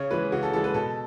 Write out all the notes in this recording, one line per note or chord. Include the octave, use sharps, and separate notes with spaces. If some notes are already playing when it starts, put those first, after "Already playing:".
Already playing: C#3 C#5
E3 G#3 B4
C#3 F#4
A4
E3 G#3 A4
B4
B2 A4